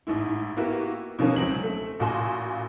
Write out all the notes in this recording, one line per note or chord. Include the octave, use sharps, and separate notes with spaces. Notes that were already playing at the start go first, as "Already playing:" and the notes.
A1 G#2 E4
A#3 B3 E4 F#4 G4
B2 D3 D#3 F3 A#3 C#4
C#2 F#3 C4 F#7
A3
A1 A#2 F4 F#4 G#5 C6